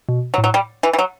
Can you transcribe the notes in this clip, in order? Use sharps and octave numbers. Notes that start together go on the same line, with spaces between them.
B2
F#3
A2
F#3
G3
E3
E3
F#3